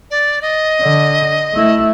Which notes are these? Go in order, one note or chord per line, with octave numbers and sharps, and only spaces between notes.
D5
D#5
D3
A3 E4